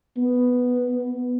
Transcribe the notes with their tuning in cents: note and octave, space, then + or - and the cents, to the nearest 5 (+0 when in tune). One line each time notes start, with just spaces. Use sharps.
B3 +0